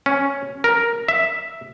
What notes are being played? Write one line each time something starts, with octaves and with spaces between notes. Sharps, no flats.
C#4
A#4
E5